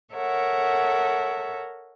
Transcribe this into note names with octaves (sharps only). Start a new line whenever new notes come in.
A4 A#4 C#5 E5 F#5